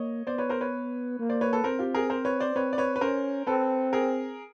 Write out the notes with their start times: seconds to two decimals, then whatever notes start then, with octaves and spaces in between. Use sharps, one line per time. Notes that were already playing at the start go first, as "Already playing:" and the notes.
Already playing: A#3 C#5 D#5
0.27 B3 C5 D5
0.38 B4 C#5
0.49 A#4 C5
0.61 B4 C#5
1.19 A#3
1.29 C5 D5
1.41 B4 C#5
1.53 A4 B4
1.64 C4 A#4 C5
1.79 F4 G4
1.95 G#4 A#4
2.10 A#4 C5
2.25 B4 C#5
2.40 C5 D5
2.55 C4 B4 C#5
2.73 D5
2.78 B4 C#5
2.96 B4
3.01 C#4 A#4 C5
3.47 C4 A4 B4
3.93 G#4 A#4